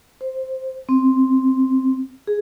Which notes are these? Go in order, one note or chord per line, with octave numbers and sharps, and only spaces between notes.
C5
C4
G#4